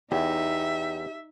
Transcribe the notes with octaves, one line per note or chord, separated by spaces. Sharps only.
E2 D#4 G4 E5